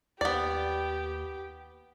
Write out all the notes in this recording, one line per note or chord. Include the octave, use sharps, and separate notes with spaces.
D#2 B3 G4 D5